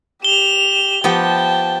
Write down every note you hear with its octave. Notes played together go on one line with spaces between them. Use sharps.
G4 E7 F7 G7
F3 B3 G4 G5 A5